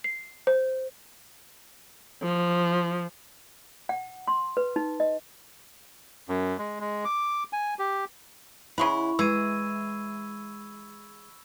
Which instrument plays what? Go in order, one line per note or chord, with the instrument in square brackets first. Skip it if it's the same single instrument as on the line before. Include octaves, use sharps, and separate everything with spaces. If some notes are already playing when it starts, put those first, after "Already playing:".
[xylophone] C7
C5
[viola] F3
[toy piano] F#5
C6
B4
D#4
D#5
[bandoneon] F#2
G#3
G#3
D6
G#5
G4
[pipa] C#3 G#3 F#5 [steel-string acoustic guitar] E4 [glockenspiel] B5 C#6
[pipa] E3 [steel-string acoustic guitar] G#3 [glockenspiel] E6 G#6 D#7